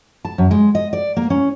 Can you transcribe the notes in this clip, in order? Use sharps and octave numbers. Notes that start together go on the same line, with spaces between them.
A5
F#2
G#3
D#5
D5
A#3
C#4